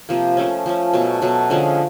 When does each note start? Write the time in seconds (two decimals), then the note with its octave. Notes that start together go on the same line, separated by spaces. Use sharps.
0.09 C3 F3 A#3
0.37 F3 A3 C#4
0.66 F3 A3 C#4
0.93 B2 F#3 A3
1.22 B2 F#3 A3
1.50 D3 F3 G#3 C#4